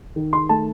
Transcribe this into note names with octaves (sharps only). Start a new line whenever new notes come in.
D#3
C6
A3 A5